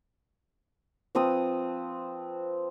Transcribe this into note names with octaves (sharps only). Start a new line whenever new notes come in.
F3 C4 B4 D#6